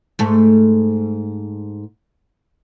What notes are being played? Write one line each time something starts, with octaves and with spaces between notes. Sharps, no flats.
G#2 A3